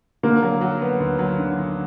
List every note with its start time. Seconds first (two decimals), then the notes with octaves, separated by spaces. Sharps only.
0.23 D3 A#3
0.42 F#3
0.61 F#3
0.82 B3
1.00 D2
1.19 F#3
1.39 D3
1.58 D3